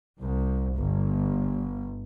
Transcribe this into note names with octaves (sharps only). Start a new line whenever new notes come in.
C2
G1